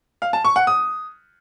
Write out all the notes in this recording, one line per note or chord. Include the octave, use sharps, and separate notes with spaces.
F5
A5
C#6
F#5
D#6